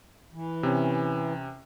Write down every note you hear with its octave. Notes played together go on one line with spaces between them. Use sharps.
E3
C3 C#4